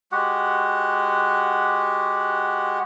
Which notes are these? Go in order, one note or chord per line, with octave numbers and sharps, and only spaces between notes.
G#3 F#4 G4 F#5